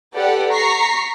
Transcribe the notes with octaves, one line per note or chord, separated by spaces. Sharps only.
G4 A4 B4 D5 F#5
A#5 C#6 B6 C7